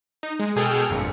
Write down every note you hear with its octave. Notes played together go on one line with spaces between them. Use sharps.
D#4
G#3
B2 G#4 A4 G5 F6
G1 F2 A#2 C#7